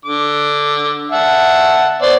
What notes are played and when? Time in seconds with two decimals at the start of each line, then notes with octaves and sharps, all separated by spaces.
0.05 D3 D6
1.12 E5 F#5 A5
2.02 B3 C5 D5